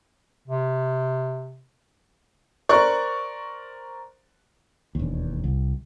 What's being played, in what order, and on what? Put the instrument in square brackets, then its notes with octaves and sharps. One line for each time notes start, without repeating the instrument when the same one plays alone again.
[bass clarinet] C3
[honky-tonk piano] A#4 C5 D5 C#6 F#6
[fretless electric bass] E1 D#2
C2